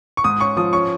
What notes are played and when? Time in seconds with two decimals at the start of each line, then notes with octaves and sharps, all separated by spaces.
0.17 C#6
0.24 G#2 D#6
0.40 C#4 C#6
0.57 F3 D#6
0.73 C#4 C#6